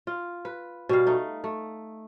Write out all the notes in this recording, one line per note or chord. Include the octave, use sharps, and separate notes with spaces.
F4
B4
B2 G3 F5
A3 D#4
A3